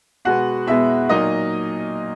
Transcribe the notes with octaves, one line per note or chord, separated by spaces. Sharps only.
B2 G#3 B3 F#4 F#5
B2 G#3 B3 E4 E5
A#2 F#3 A#3 D#4 D#5